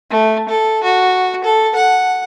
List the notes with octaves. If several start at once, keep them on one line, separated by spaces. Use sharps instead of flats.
A3
A4
F#4
A4
F#5